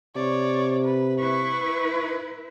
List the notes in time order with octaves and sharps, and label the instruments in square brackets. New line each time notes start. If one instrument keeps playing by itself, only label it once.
[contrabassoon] C3 [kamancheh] C#5 D5
[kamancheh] B4
[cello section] E4 B4 [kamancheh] C#6